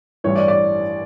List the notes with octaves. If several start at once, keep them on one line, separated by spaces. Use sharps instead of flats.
A1 G2 E3 G3 C#5
D5
D5